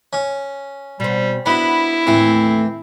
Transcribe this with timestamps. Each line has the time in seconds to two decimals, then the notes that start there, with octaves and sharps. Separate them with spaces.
0.13 C#4
1.00 B2 G3 C4
1.46 B3 D4 E4 F#4 B5
2.07 D#2 A2 E3 A3 C4